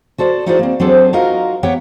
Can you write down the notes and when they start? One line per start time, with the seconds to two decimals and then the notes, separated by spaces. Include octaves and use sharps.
0.18 F#4 A4 C5 D5
0.46 D#4 E4 F#4 G#4 C5 D5
0.59 A#3 C4
0.80 F#3 C4 D4 G#4 A4 C5
1.13 D#4 F4 F#4 A#4 D#5 F5
1.63 B3 G4 C#5 F#5 G5